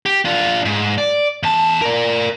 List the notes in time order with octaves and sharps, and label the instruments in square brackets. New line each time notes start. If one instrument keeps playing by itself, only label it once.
[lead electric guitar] G4
D4 F4
G#2
D5
E2 A5
A#4 D5